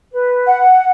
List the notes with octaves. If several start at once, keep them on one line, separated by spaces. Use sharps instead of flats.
B4
F#5